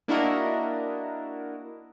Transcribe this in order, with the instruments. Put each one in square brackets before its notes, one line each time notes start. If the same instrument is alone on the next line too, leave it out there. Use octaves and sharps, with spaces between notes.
[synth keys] A#3 D4 E4 F#4 A#4 D#5